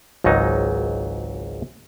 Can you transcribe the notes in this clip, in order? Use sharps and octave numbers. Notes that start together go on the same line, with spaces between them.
G#1 C#2 G#2 F#3 D#4